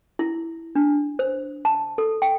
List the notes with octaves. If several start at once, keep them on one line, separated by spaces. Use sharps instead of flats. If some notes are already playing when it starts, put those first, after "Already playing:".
E4
D4
C5
A5
A4
G5